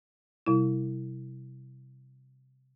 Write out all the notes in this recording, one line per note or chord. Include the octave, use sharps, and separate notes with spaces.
C3 G3 E4